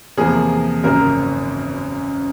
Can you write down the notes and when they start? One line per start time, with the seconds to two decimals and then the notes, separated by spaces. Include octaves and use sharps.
0.17 E2 C3 F3 A#3 G#4
0.84 G#1 F#2 C#3 A#4